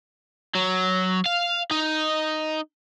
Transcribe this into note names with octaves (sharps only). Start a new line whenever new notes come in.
F#3
F5
D#4